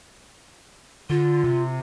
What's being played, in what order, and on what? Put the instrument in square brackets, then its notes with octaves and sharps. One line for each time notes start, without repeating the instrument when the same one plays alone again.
[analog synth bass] D3 [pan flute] F4
[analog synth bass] C3